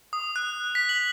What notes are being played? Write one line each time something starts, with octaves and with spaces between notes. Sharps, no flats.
D#6
F#6
B6
F#7